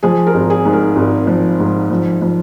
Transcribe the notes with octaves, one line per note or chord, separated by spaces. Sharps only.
F3 G#4
A#4
G#1
G#4
G#2
A#4
G#1
F3
G#2
F3
F3